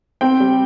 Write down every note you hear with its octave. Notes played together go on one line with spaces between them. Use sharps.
C4 G5
G3